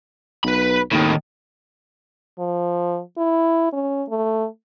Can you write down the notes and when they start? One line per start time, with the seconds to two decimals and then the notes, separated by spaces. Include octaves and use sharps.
0.44 B1 B4 B5
0.92 D#2 A2 D#3
2.39 F3
3.18 E4
3.73 C#4
4.09 A3